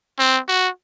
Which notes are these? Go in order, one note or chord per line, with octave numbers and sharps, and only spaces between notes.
C4
F#4